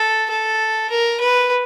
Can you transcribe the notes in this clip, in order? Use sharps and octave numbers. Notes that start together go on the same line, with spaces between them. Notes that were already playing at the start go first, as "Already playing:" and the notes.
Already playing: A4
A4
A#4
B4